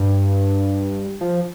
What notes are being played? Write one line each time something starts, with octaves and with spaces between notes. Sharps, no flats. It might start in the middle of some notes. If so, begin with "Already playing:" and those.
Already playing: G2
F3